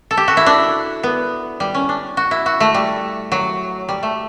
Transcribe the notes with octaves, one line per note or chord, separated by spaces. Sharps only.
A4
G4
F#4
E4
D4
B3
G3
C#4
D4
F#4
E4
F#4
A3
G3
F#3
G3
A3